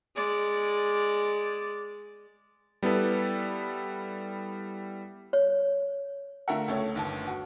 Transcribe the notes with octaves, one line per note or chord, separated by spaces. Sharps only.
G#3 D5
G3 B3 E4 A4 B4
C#5
D3 A3 F4 A#4 E5 F#5
C#2 A3 C#5
G1 D#2 A5
F#4